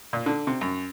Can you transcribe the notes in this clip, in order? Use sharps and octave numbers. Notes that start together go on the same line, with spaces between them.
A#2
D3
C3
F#2